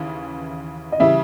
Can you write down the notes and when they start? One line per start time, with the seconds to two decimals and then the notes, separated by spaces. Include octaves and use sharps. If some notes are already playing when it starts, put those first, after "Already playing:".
Already playing: D#2 C#3 E3
0.92 D#5
1.00 C#3 E3 G3 E5